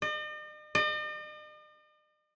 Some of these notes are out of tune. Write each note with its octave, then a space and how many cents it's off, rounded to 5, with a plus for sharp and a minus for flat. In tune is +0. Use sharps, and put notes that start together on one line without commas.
D#5 -45
D#5 -45